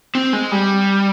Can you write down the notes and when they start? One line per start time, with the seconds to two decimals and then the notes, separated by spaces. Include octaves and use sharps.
0.15 C4
0.33 G#3
0.51 G3